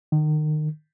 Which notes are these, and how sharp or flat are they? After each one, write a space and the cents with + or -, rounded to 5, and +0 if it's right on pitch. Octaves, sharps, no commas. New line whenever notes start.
D#3 -30